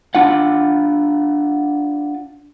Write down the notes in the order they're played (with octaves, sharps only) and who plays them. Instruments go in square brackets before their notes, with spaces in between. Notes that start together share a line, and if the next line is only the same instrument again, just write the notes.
[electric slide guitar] D4 F4 F#5